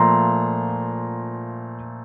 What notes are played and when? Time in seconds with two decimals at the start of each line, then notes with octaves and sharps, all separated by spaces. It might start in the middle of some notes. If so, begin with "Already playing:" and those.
Already playing: A#2 F3 A3 A#5 C6